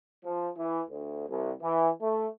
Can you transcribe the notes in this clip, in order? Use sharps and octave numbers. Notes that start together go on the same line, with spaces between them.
F3
E3
D2
C2
E3
A3